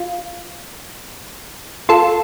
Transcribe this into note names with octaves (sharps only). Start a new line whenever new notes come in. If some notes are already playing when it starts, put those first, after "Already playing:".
Already playing: F4
F4 A4